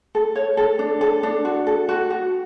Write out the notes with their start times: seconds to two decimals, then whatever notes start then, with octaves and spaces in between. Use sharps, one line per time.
0.15 A4
0.36 C#5
0.57 A4
0.79 D4
1.01 A4
1.23 D4
1.45 F#4
1.67 A4
1.89 F#4
2.10 F#4